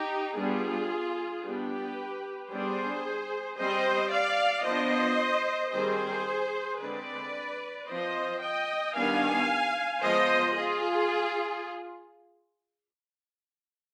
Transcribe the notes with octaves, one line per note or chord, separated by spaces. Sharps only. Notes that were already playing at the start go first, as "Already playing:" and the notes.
Already playing: D#4 G4
G3 B3 D4 F4 G#4
G3 B3 D4 G4 B4
G3 B3 D4 G#4 C5
G3 C4 C5 D#5
D5 F5
F3 B3 D4 C5 D#5
D#3 G3 C4 G#4 C5
D3 G#3 C4 B4 D5
F3 C4 C5 D#5
D#5 G5
D#3 G3 B3 D4 F5 G#5
F3 G#3 B3 C5 D#5
F4 G#4